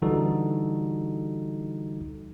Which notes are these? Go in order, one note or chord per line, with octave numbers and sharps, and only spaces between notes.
D3 E3 G3 D#4 F#4 A4